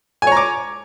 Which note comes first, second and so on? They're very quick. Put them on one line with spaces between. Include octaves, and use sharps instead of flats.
G#5 C#5 A#5 D6